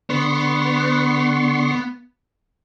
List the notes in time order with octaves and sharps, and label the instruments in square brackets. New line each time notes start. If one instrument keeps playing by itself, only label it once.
[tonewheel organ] D3 C6 C#6 [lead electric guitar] B3